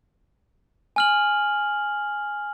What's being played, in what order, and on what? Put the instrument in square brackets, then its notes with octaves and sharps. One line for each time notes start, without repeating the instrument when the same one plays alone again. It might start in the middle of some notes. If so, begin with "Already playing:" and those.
[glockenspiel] G#5 F6 F#7